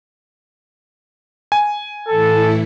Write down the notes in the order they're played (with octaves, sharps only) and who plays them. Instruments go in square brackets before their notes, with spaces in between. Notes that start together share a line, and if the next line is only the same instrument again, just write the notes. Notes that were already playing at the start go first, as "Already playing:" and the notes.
[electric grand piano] G#5
[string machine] A2 E3 E4 [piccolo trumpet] A4